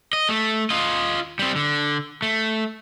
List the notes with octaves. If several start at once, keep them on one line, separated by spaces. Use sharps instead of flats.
D#5
A3
F4 D#5
G3 C4
D3
A3